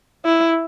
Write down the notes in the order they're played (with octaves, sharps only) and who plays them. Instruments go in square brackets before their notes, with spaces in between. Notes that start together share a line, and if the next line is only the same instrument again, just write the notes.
[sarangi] E4